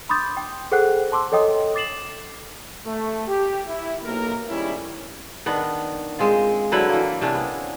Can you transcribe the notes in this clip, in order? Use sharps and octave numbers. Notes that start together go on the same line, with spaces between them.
B5 C6 D6 D#6 G6 A6
G5
G#4 A4 C5 F#5 G5 F#6
A5 C6 D6 E6
A4 C#5 D#5 G5 D#6
D6 A6 C7 E7 F#7
A3
G4
E4
B1 A#3 A#4
G#2 D#3 G3 C#4 E4
D#3 B3 D4
G#3 C4 F4
D3 F#3 E4 B4
E3 A#3
C3 C#4 D4
B3